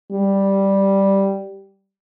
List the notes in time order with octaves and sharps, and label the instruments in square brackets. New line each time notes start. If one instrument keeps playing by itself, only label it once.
[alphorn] G3